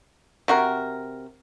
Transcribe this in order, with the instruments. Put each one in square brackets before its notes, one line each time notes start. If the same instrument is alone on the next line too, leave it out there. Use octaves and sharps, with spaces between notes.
[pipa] C3 F#4 A#4